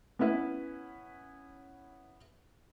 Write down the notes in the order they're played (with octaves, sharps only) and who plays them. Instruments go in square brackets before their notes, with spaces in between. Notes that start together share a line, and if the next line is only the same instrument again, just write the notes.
[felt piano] B3 C#4 E4 B4